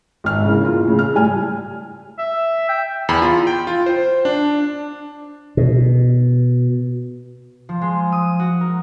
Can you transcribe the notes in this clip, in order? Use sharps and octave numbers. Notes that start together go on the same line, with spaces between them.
G#1 F6
C#3 E3 A#3
F4
A2 C#3
F6
A2 G3 G#5 F6
E5
G5
E2 B5
F4
G5
F4
C5
D4
B2
F3
G#3
D#6
F#4
A#4